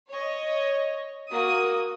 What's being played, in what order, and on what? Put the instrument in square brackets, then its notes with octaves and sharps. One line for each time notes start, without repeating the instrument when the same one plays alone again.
[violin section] C#5 D#5
A#3 F#4 D#6